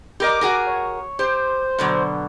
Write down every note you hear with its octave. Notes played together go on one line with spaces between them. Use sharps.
G4 A#4 D#5 D6
F#4 G#4 A#4
C#5
G4 C5
B2 D3 F#3